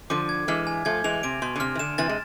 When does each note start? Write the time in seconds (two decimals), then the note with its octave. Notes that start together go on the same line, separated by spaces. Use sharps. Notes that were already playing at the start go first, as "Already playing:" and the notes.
0.10 D3 F3 D6
0.29 G#6
0.48 E3 G#3 F6
0.67 G#5
0.85 F3 A3 G#6
1.04 E3 G#3 F7
1.23 C3 D7
1.42 B2 C6
1.56 D3
1.60 C3 F6
1.75 E3
1.79 D3 E7
1.98 C3 E3 A6
2.09 G#3